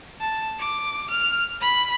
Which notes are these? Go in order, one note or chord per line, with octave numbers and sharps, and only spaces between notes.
A5
D6
F6
B5